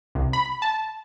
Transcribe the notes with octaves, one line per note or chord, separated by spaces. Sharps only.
C2
B5
A5